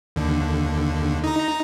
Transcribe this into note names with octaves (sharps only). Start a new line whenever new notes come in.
D#2 D3
D#4 A#5